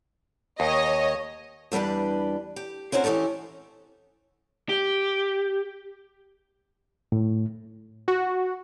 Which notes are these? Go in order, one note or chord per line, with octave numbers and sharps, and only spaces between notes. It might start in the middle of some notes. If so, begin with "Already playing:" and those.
D#2 C#5 D#5
E2 G3 D4 G4 B4
G4
C4 C#4 D#4 F#4 C5
E3 C#4 D#4 G4 A4
G4
A2
F#4